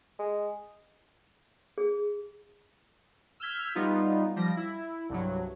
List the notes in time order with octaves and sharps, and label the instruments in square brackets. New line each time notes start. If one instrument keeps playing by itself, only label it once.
[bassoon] G#3
[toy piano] G#4
[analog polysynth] E6 F6 G6 G#6 B6
G3 B3 D#4 F4
F3 G3 A#6
E4
C2 G2 F#3